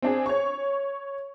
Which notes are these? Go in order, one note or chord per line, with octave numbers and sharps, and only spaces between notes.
C4 D4 G#4
C#5 C#6